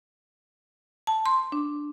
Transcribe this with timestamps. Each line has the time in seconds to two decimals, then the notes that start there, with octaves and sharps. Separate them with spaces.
1.07 A5
1.26 C6
1.52 D4